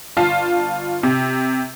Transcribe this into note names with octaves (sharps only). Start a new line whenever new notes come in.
G1 F4 A5 C7
C3